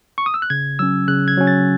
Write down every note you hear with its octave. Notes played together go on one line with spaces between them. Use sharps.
C#6
D#6
E6
F#6
C#3 G#6
F#3 C#4 E6
C#3 F#6
G#6
F#3 C#4
A6